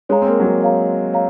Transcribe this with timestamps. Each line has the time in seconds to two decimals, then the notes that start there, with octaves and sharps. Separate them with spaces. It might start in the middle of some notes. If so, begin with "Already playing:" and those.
0.09 G#3 C#5 F5 A#5
0.22 C4
0.27 A#3
0.40 F#3
0.44 G#3
0.61 C#5 F5 A#5
1.13 C#5 F5 A#5